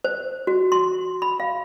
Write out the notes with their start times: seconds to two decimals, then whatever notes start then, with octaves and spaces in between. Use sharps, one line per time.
0.04 C5
0.47 F#4
0.72 C6
1.22 B5
1.40 F5